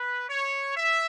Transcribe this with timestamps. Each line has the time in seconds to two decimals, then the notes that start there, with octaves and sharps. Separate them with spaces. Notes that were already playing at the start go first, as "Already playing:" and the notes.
Already playing: B4
0.29 C#5
0.77 E5